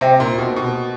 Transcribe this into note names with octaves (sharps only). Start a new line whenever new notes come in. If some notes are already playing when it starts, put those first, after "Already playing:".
C3 C5 E5 G5
A#2
B2
B2